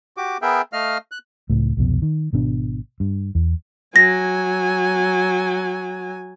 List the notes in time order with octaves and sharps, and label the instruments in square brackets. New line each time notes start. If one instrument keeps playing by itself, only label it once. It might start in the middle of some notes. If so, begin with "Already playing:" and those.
[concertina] F#4 G4 D6
B3 G#4 A#4 E5 G5
A3 D#5 F5 F6
F#6
[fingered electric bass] C#2 A2
C2 F2 B2
D#3
G#1 B2 D4
G2
E2
[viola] F#3 G#5 [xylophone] A#6